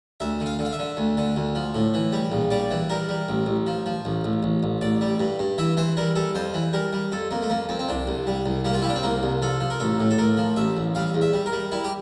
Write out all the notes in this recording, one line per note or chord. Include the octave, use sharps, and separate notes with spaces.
D2 E5
D3
F5
D3
F5
E5
D3
D2
D3
D2
F3
A2
E3
G3
A#1
G3 D5
E3
G3 A#4
G3
A1
A1
F3
F3
A1
A1
A1
A1
A1 D5
G3
G2
G2
E3 E5
E3 C5
G3 A#4
G3 A4
F2 C5
E3
G3 A#4
G3
F2 A4
F2 A#3
A3
F2 A#3
F2 C4
C4
C2 D4
C2
G3
C2
G3 A#3
F4
G3 E4
D4
C4
C2 A#3
C2
F3 A4
F3
A#4
A1 A4
A2
A4
A2 A#4
F3
A1 E5
A1
G3 F5
E2
E5
G3
A#4
G3
G3 E4
G4